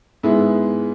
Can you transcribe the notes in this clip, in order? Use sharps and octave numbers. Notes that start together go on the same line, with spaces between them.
G#2 G#3 B3 E4 G#4